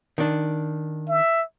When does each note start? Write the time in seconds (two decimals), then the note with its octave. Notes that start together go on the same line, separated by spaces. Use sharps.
0.18 D#3 D4
1.09 E5